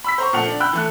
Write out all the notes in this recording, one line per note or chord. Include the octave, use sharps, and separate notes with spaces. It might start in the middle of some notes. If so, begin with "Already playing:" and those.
B5 E6 B6
C5 A#5 C#6
A#2 F3 A3 F#5 F7
D4 D5
G5 B5 E6 F#6
E3 A3 F#6